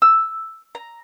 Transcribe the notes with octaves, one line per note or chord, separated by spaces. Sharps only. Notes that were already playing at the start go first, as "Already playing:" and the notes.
E6
A#5